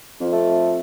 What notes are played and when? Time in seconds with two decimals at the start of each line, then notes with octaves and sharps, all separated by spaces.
0.20 F2
0.32 A3